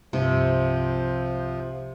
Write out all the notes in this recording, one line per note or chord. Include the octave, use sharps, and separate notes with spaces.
C2 G2 C3 F3 G6